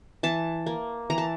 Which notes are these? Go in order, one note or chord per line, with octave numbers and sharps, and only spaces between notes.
E3 A5
A#3
E3 A#5
A5